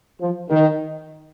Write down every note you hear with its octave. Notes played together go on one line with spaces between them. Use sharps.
F3
D#3